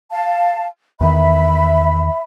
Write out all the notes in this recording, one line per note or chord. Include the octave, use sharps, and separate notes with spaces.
F5 A5
E2 D#3 E5 B5